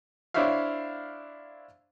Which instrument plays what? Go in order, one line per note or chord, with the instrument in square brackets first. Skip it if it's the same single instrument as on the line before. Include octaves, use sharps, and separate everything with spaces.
[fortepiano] D4 E4 C5 C#5 E5 F5